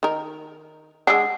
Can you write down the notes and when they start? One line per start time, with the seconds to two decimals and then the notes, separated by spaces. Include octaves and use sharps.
0.03 D#3 A#4
1.07 G#3 D4 F#5 D#6 E6